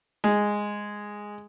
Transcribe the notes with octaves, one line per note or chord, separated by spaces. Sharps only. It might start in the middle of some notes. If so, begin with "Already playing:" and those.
G#3